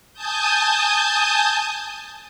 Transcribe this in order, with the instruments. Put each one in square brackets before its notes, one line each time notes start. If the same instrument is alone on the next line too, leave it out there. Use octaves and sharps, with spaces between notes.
[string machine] G#5 A5 D#6 G6